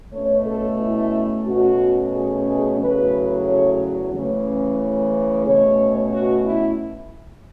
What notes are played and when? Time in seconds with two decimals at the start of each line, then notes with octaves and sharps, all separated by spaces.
0.14 B2 A3 C#4 C#5
0.46 A4
0.80 E4
1.46 B2 A3 C#4 F#4
2.13 G#4
2.46 G#4
2.79 E2 C#3 F#3 A3 B4
3.45 C#5
4.13 C#3 E3 A3 C#4
5.46 B2 A3 C#4 C#5
6.12 F#4
6.44 E4